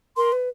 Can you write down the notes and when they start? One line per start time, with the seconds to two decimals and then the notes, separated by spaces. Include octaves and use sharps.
0.17 A#4 C6
0.32 B4